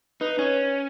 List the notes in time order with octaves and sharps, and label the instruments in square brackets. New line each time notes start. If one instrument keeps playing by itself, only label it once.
[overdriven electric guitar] D#4 [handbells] B4
[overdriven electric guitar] C#4 [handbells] C#5
[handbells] C#5